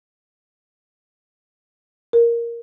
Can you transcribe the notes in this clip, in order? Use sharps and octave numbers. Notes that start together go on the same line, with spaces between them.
A#4